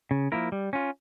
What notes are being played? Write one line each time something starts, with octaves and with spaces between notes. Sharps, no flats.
C#3
F3 A#3 E4 A#4
G3
C#4 F4